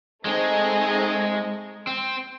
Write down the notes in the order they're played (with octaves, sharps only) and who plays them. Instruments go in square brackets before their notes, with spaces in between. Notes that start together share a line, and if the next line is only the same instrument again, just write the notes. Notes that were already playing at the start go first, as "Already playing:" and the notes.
[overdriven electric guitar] G#3 [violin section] A3 C4 D#4 G#4 D#5
[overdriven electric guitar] C4